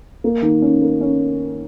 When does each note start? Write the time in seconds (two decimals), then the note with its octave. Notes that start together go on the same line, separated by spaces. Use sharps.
0.24 A#3
0.42 D#3
0.62 C#4
0.81 A#3
1.01 C#4